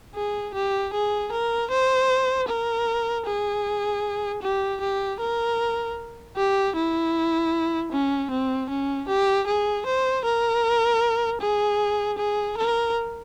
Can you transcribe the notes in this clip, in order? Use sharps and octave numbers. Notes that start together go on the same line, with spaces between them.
G#4
G4
G#4
A#4
C5
A#4
G#4
G4
G4
A#4
G4
E4
C#4
C4
C#4
G4
G#4
C5
A#4
G#4
G#4
A#4